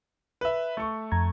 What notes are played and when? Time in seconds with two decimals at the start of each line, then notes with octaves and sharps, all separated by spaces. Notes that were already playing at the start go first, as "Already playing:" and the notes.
0.41 B4 E5
0.77 A3 C#6
1.12 F2 A#5 G#6